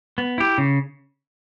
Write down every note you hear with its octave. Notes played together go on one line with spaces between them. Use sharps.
B3
E4 G4
C#3